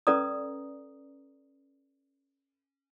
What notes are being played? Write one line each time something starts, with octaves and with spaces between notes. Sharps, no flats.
C#4 A4 B4 D5 A#5 D#6